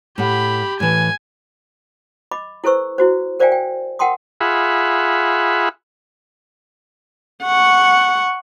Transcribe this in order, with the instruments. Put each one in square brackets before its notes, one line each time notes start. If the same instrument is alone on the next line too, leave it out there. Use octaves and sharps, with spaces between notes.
[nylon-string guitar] A2 F#5 [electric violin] G4 B5
[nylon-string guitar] A2 E3 [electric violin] G#5
[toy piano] D#5 B5 D6
E4 A4 B4 C5 C#6 E6
E4 F#4 C5
A#4 C5 D5 F5 G5 G#5
G5
A#4 F#5 G5 A5 C6 D#6
[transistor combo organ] F4 G#4 E5 F#5 B5
[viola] F#5 C#6